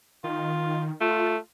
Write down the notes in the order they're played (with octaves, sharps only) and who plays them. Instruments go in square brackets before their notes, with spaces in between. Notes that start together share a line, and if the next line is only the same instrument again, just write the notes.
[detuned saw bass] D#3 [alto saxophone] F4
[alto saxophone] A3 [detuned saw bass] F4